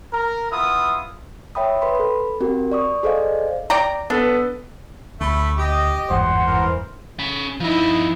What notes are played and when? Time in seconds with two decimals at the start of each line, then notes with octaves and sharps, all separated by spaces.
0.13 A#4
0.51 B3 E4 F4 D#6
1.55 C#5 E5 G5 B5 D#6
1.82 B4 B5 C6
1.95 A4 B5
2.40 C4 F#4 G4 A#4
2.72 D5 C#6 D#6
3.03 G#4 A4 C5 D5 D#5 F5
3.70 D5 G5 A#5
4.10 B3 D4 A4 B4
5.20 D2 A3 B5
5.58 G4 D#5
6.10 G1 E2 G#2 C5 F#5
6.46 E3 A#4
7.19 C#4 B5
7.60 F3 D#4 E4 D#5